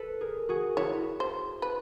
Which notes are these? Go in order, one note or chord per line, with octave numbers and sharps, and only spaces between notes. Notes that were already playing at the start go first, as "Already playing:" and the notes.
Already playing: A4 B4
G#4 A#4
F#4 G#4
E4 F#4 C#5
C5
B4